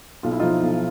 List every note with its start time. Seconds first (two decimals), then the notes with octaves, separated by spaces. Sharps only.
0.23 B1 F4
0.32 E4
0.39 F3 D#4 F4
0.62 B1